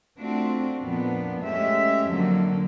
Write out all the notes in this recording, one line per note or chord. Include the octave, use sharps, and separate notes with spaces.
A3 C4 D4 F4 F#4
F2 A#2 F3 B3 D4
G#3 A3 C#4 G4 E5
F2 D3 F3 F#3 A#3